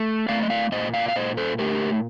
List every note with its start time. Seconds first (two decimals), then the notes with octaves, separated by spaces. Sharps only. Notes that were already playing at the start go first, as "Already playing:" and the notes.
Already playing: A3
0.28 A3 D5 F5
0.42 D#5
0.50 D5 F5
0.72 A#2 C5 D#5
0.94 D5 F5
1.08 F5
1.16 A#2 C5 D#5
1.37 A4 C5
1.59 A3 G4 A#4